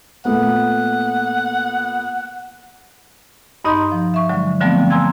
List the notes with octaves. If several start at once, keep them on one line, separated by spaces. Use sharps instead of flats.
A#2 A3 B3 F#5
G2 D#4 D#5 A#5 C6 G6
F3
E5 C#6
D3 F#3 G#3
D3 F3 G3 A3 B3 C4
G#5 A#5 C6 E6 G#6